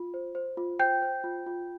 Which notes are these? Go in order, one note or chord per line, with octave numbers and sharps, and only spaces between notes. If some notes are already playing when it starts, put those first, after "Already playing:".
Already playing: F4
C5
C5
F4
C5 G5 G6
C5
F4
F4